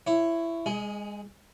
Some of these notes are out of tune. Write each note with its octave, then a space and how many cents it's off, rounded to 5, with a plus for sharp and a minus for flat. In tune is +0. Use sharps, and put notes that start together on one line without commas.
E4 +15 C#5 -5
G#3 -25 G#4 +15 D#5 +25